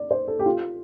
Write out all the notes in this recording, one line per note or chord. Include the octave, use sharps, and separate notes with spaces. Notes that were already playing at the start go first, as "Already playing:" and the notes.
Already playing: D5
C5
A4
G4
F4